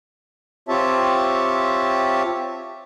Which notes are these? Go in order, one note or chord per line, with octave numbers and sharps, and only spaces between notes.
C4 F4 G4 C#5 E5 A5